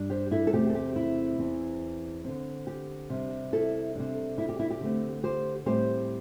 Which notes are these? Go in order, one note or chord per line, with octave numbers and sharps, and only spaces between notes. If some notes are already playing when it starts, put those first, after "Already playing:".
Already playing: G2 G3 D4
G4 C5
E4 A4
A4
E2 C3 A3 C4 G4
A4
G4
E4
E2 E3 C4
D3 C4
G4
C3 G3 D4
E4 A4
C3 G3 D4
E4
G4
E4
G4
D3 A3 C4
G4 C5
A2 G3 C4 G4 C5